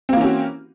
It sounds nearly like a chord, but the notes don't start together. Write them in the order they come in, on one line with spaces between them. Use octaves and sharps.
C4 A#3 E3 C#4 F#4